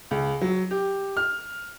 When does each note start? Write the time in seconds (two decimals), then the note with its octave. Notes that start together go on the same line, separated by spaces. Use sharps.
0.11 C#2
0.41 F#3
0.71 G4
1.17 F6